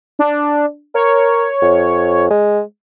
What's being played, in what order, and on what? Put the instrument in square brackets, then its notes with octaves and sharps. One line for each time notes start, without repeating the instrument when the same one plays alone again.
[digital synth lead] D4
[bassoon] A#4 [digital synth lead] C#5
[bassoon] F2
G#3